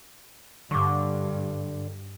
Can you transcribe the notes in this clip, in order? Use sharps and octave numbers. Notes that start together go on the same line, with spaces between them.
G2 D3 C#6 D6